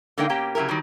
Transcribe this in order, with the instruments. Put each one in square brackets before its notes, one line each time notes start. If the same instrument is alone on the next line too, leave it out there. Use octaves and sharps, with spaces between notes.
[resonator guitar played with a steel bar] D3 G#3 A#3 D4 D#4 G5
B2 A#3 C#4 G4 G5
C#3 F#3 G#3 E4 G4 A#4
D#3 E3 F#3 G3